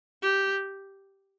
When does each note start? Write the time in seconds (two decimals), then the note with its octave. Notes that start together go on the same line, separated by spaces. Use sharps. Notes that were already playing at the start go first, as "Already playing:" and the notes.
0.22 G4